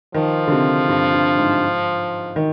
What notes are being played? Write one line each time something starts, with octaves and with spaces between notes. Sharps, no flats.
D#3 F3
D3
C3
G2
G2
G#2
D#3